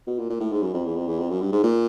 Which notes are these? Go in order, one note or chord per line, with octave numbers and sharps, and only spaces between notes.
B2
A#2
A#2
A2
G#2
F#2
F2
E2
F2
E2
F2
F#2
G2
G#2
A#2